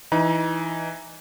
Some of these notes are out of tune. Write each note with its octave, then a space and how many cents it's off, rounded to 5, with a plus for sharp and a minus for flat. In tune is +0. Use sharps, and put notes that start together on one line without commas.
E3 +0 D#4 +0 A#5 +40